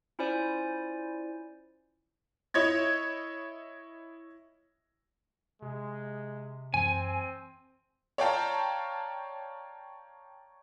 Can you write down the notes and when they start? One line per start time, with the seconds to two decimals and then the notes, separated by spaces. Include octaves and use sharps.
0.19 C#4 E4 F4 C5 D5 G#5
2.54 E4 C#5 D#5 G#6
5.62 C3 G#3
6.74 F#2 E3 A3 C4 G#5
8.18 C#5 D5 F5 G5 A5 A#5